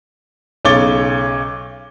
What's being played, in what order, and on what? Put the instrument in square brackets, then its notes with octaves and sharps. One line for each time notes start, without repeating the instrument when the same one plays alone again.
[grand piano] B1 C#3 C#5 D6 A6 G7